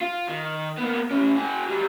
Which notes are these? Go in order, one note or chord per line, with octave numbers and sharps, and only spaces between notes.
F4
D#3
A#3 B3
A2 C#4
F#4 G#4
F#3 G3